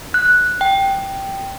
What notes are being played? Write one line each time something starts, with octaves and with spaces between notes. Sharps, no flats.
F#6
G5